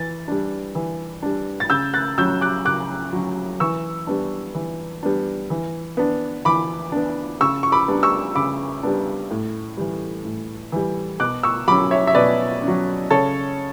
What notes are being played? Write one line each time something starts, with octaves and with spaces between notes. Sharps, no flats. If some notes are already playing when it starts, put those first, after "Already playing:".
Already playing: E3 A6
G3 D4
E3
G3 D4
A6
C#3 E6 G6
F#6 A6
F#3 C#4 E6 G6
D6 F#6
C#3 D6 F#6
F#3 C#4
E3 C#6 E6
G3 B3 D4
E3
G3 B3 D4
E3
B3 D4
E3 B5 D6
B3 D4
C#3 C#6 E6
C#6
B5 D6
G3 B3 D4
C#6 E6
C#3 B5 D6
G3 B3 D4
A2
E3 G3
A2
E3 G3
B2 D6 F#6
C#6 E6
F#3 C#4 B5 D6
C#5 E5
E5
B2 B4 D5
C#4
F#3
C#3 A4 C#5